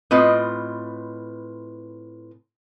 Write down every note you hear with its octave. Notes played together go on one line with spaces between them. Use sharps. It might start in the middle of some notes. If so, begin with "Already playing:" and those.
A2 C4 F4 B4 D#5